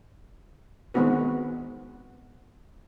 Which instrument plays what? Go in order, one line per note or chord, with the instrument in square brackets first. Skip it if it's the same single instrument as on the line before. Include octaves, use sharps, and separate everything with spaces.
[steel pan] D#3 G#3 B3 C4 F#4 B4